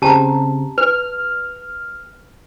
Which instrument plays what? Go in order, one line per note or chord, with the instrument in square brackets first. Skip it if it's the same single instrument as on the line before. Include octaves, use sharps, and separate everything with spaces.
[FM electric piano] C#3 C4 [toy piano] G4 A5 A#5
[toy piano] B4 [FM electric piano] F6